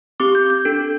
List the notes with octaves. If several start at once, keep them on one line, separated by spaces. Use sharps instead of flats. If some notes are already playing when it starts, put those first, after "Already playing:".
C4 G4 D6
G6
G6
D4 A4 G6